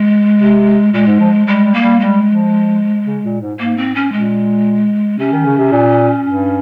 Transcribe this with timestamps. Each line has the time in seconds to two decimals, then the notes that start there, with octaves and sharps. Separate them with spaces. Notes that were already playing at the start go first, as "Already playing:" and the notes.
Already playing: G#3
0.41 C3
0.94 A#2 G#3
1.07 G#2
1.20 F3
1.47 G3 G#3
1.65 G3
1.74 A#3
1.82 G3
2.00 G3 G#3
2.27 F3
3.06 C#3
3.24 A#2
3.42 G#2
3.59 G#2 A#3
3.77 C4
3.95 C#4
4.12 A#2 G#3
5.19 C3 C#4
5.32 D#3
5.45 C#3
5.58 C3
5.72 A#2
6.25 G2